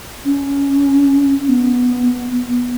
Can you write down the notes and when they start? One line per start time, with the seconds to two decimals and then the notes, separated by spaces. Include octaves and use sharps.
0.25 C#4
1.45 C#4
1.49 B3